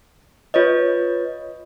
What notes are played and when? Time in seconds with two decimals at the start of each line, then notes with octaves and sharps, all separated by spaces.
0.54 F4 B4 C#5 D#5